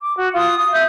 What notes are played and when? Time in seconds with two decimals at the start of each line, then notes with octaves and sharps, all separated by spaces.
0.02 D6
0.18 F#4
0.35 F4 D#6
0.58 D#6
0.73 E5 G6